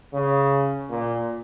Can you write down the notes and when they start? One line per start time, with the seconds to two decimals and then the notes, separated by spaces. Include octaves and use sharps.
0.13 C#3
0.90 A#2